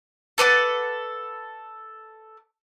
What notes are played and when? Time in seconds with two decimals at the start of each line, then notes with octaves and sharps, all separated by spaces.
0.38 A4 B4 D5 F#5